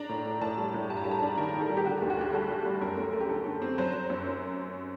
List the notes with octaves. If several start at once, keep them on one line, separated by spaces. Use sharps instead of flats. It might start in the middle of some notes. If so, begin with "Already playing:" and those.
Already playing: D4 A#5
A2
A2
A2 A5
G3
A2
G2 A5
A#5
G3 A5
A#5
A5
D4
D#3 A#4
D#3
A4
G3
G4
D3 F#4
G4
D2
F#4
D2 G4
G3 A4
G3
G3
F#2 A#4
A3
A3
G4
D3 A4
D3
C4
F#3 C5
F#3
F#2